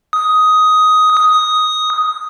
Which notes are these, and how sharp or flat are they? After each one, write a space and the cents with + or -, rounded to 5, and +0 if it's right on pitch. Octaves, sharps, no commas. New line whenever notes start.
D#6 +10
D#6 +5